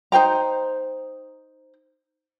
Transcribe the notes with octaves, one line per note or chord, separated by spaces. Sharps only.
D#4 C5 G5 A#5